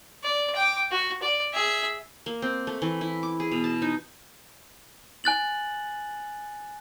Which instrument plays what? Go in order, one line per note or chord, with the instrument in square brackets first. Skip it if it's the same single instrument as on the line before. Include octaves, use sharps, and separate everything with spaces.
[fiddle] D5
G5 D6
F#4
D5
G#4 E5
[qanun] A#3
C4
A3
E3
E4
D6
G#4
B2
A5
D#4
[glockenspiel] G#5 F#6 A6 F#7